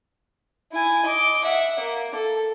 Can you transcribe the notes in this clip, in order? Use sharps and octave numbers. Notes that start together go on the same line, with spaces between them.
E4 G#5
D#5 D6
E5 F#5
A#3
A4